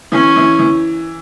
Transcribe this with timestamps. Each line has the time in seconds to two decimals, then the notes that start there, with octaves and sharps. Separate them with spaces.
0.12 E3 C#4
0.36 E3
0.59 E3